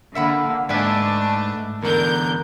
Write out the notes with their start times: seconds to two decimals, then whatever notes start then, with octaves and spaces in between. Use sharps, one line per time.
0.15 D3 A#3 E5 F#5 B5
0.69 G#2 A3 D4 B4 D5 E5 G#5
1.83 E2 D3 A#4 G6